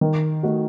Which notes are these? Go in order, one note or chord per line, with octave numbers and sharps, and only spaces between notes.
D#3
A3 D#4 F#4